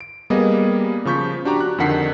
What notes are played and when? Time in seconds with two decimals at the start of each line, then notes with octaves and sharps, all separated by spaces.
0.01 D7
0.30 G3 A#3 B3 G#4 D#5
1.05 C#3 F3 C#6 G6 B6
1.45 D4 F#4 G4 A#5
1.60 F#6
1.78 F2 D3 D#3 F#5 B6 C7